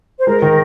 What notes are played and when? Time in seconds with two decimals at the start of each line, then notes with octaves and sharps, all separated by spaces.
0.19 C5
0.27 G#3 A#4
0.42 D#3